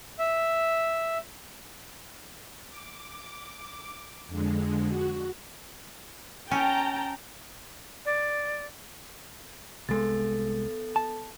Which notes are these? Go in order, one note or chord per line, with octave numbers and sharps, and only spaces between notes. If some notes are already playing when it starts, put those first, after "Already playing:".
E5
D6
F2 D3 G#3
F#4
C#4 G5 A5 A#5
D5
C2 G#3 B3 A4 A6
A5